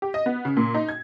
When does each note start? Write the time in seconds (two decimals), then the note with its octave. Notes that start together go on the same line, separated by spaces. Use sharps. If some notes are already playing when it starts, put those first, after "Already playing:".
0.02 G4
0.14 D#5
0.26 B3
0.45 C#3
0.57 A#2
0.74 D#4
0.89 G#6